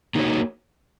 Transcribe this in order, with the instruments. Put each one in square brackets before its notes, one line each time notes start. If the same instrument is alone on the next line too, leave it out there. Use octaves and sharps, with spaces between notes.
[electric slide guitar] A#3 D#4 F#4 C#5